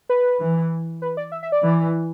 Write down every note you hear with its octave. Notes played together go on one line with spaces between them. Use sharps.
B4
E3
B4
D5
E5
E5
D5
E3